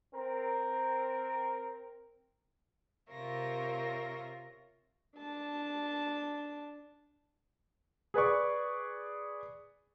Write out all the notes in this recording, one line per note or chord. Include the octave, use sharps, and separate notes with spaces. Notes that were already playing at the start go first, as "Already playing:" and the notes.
C4 A#4
C3 F4 A#4 C#5 E5 A#6
D4 A5
G#4 B4 D5 C#6